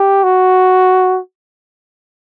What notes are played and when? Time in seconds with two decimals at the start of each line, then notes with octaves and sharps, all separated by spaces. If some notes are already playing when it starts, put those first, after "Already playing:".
Already playing: G4
0.24 F#4